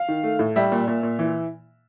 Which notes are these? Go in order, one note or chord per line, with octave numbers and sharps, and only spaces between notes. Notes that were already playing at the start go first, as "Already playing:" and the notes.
Already playing: F5
D#3
A3
A2
G3 E5
A#2
A#2
A#2
E3